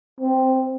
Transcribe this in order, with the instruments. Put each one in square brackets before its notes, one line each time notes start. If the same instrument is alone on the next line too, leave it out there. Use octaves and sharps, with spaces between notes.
[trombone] C4